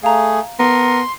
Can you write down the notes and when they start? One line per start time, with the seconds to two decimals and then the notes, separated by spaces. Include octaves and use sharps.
0.03 A3 G#4 F5 A#5
0.59 B3 A#4 C6